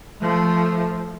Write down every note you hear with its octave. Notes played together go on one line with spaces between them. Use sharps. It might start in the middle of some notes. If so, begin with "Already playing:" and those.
F3 A3